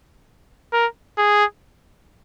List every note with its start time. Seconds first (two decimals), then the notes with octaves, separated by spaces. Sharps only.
0.73 A#4
1.18 G#4